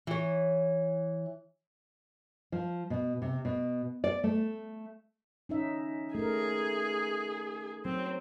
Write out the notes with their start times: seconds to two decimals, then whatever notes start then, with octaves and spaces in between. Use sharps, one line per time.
0.07 E3 C#5
2.52 F3
2.90 B2
3.22 C3
3.45 B2
4.04 D5
4.24 A3
5.49 C#4 D#4 E5
6.15 A3 G#4 A#4
7.85 F#3 C4